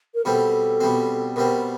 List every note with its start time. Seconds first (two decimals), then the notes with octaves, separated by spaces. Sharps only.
0.15 A#4
0.25 B2 G3 C4 A4
0.80 B2 G3 C4
1.36 B2 G3 C4 A#4